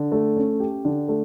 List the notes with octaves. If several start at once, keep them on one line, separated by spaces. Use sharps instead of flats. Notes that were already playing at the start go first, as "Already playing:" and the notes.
Already playing: D3
A3
C#4
G4
D3
A3